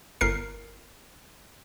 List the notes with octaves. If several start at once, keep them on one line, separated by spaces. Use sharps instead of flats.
G1 A#4 C7